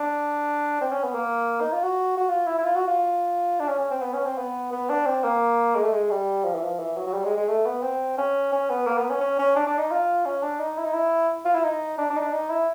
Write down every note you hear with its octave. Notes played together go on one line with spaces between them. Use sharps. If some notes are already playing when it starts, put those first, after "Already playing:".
Already playing: D4
C4
C#4
B3
A#3
D#4
F4
F#4
F#4
F4
E4
E4
F4
F#4
F4
D4
C#4
C#4
C4
B3
C#4
C4
B3
B3
D4
C4
A#3
G#3
A3
G#3
G3
F3
E3
F3
E3
F#3
F#3
G3
G#3
G#3
A3
B3
C4
C#4
C#4
B3
A#3
B3
C#4
C#4
C#4
D4
D4
D#4
F4
C#4
D4
D#4
E4
D#4
E4
F4
E4
D#4
D4
D4
D#4
D4
D#4
E4